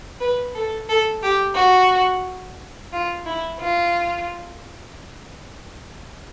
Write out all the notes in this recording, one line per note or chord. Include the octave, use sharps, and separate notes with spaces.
B4
A4
A4
G4
F#4
F4
E4
F4